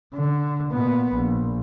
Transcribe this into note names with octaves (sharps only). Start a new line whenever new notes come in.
D3
A#2 B3
A#1